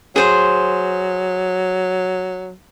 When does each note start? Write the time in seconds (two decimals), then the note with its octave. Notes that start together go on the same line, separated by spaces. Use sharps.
0.16 F#3 G#4 C5